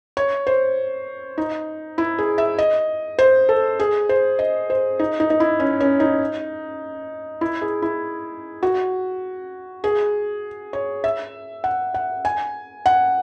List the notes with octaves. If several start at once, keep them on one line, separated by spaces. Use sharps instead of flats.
C#5
C5
D#4
E4
G#4
E5
D#5
C5
A4
G#4
C5
D#5
C5
D#4
D#4
D#4
E4
C#4
C#4
D#4
E4
G#4
E4
F#4
G#4
C#5
E5
F#5
F#5
G#5
F#5